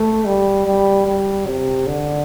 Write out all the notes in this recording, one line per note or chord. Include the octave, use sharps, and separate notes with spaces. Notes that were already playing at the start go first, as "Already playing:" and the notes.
Already playing: A3
G3
G3
G3
C3
D3